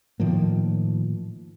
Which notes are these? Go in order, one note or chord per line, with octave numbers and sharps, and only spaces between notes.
A2 D#3 F3 A#3